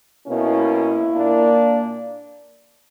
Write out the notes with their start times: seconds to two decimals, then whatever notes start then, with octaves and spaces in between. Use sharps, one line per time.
0.25 B2 A#3 C#4 E4
1.10 A#2 A#3 D4